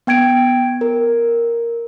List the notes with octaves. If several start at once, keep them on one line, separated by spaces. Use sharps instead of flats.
B3 G5 G#6 D7
A#4